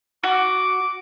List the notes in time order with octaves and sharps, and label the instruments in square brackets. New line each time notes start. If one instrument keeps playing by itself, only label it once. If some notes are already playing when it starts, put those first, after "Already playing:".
[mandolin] F#4 [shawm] D6